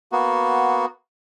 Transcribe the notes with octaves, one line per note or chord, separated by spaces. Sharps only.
A#3 B3 F#4